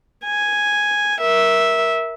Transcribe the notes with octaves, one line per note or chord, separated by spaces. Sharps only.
G#5
A#4 E5